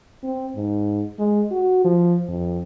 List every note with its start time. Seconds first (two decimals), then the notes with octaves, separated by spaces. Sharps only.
0.23 C4
0.56 G#2
1.19 G#3
1.51 F#4
1.85 F3
2.28 F2